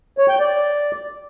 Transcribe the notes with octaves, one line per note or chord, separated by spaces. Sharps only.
C#5
G5
D5